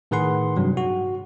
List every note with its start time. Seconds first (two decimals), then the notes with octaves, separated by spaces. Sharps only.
0.11 A2 D#3 G#4 B4 F#5 C6
0.57 G2 C3 F#3
0.77 F#4